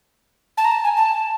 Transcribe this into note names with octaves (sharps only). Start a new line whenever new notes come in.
A5
A#5
A5
G#5
A5